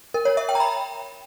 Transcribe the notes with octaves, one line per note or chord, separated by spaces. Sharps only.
A#4
C#5
E5
G5
A#5
B5